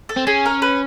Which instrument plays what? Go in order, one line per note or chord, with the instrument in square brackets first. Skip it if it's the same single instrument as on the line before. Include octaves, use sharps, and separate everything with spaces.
[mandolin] A4
[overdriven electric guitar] C4
[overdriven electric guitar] C#4 [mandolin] G#4
[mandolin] A#4
B4